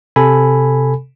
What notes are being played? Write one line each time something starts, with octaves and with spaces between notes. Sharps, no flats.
C3 A4 G#5 B5